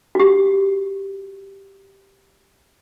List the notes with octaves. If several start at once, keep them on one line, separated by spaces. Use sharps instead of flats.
F#4 G4